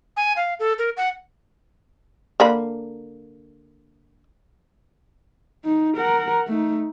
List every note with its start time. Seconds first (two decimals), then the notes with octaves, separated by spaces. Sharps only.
0.17 G#5
0.37 F5
0.60 A4
0.79 A#4
0.97 F#5
2.40 D3 A#3 B5
5.65 D#4
5.97 A#4 F#5
6.48 A3 D#4